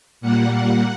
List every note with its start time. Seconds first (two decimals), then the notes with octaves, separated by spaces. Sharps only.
0.21 A#2 G3 A#3 F#5
0.52 F#5